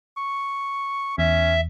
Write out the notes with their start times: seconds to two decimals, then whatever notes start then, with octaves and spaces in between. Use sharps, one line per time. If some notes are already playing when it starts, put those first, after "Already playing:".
0.17 C#6
1.18 E2 C#4 E5